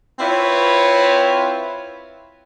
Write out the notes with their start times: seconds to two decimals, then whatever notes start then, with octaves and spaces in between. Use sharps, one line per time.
0.19 C4 E4 F4 B4 C#5